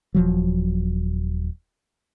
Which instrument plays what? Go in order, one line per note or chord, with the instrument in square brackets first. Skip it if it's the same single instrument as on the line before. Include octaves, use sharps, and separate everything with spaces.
[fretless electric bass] D#1 F3 F#3